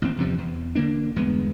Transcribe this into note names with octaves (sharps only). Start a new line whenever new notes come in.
A1 D#2 C4
E2 G2 C3 F3
E2
D3 E3 A#3 D4
G1 E2 G#3 B3